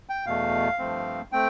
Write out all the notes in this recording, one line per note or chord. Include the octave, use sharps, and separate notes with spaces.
G5
E2 B2 A3 F5
G2 F3 A3 C4
A3 C4 G5